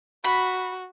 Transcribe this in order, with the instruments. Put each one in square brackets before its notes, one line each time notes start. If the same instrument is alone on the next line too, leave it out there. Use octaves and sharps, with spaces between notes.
[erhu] F#4 [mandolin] B5